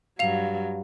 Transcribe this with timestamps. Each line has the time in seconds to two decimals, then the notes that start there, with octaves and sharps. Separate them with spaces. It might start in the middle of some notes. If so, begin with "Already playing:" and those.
0.19 G2 F#3 F5 F7